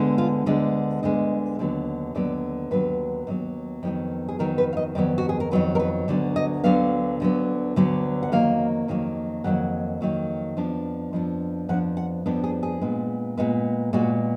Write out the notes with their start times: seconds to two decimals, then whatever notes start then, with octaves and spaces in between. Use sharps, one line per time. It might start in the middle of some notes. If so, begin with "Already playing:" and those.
Already playing: D2 D3 G#3 B3
0.18 F4
0.46 D2 D3 G#3 B3
1.03 D2 D3 G#3 B3 D#5
1.59 D#2 D3 F#3 B3
2.15 D#2 D3 F#3 B3 D5
2.71 D#2 D3 F#3 B3 B4
3.27 D#2 D3 F#3 B3
3.83 F2 D#3 F#3 B3
4.28 G#4
4.39 F2 D#3 F#3 B3 A#4
4.58 B4
4.73 F5
4.77 D#5
4.95 F2 D#3 F#3 B3 D5
5.18 F#4
5.29 G#4
5.40 A#4
5.51 F2 D#3 F#3 B3 B4
5.75 A#4
5.80 B4
6.08 D2 D3 F#3 B3
6.36 D#5
6.64 D2 D3 F#3 B3 F5
7.20 D2 D3 F#3 B3
7.76 D2 D3 F#3 B3
8.23 F#5
8.32 F2 D#3 F#3 A#3 F5
8.88 F2 D#3 F#3 A#3
9.44 F2 D#3 F#3 A#3 F#5
10.01 F2 D#3 F#3 A#3
10.57 F2 F3 B3 D4
11.13 F2 F3 B3 D4
11.69 F2 F3 B3 D4 F#5
11.97 F#5
12.26 F2 F3 B3 D4
12.44 G#4
12.63 G#4
12.81 A#2 G#3 B3
13.37 A#2 G#3 B3
13.93 A#2 G#3 B3 F#4